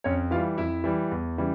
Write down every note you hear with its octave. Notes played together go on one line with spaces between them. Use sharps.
F2 C#4 C#5
E3 G3 F4 F5
F2 E4 E5
E3 G3
E2
C#3 E3 G3